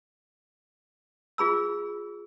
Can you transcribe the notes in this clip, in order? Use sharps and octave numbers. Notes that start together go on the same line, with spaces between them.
F4 G#4 B5 E6